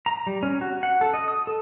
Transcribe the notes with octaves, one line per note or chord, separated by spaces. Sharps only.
A#5
G3
C#4
F#4
F#5
A4
D#5
D#6
A4